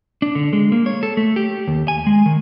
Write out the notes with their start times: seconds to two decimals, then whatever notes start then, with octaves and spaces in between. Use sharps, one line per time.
0.22 D4
0.35 D3
0.53 G#3
0.72 A#3
0.86 C#5
1.03 A4
1.17 A3
1.36 G4
1.68 D#2
1.88 G#5
2.07 G#3
2.26 D#3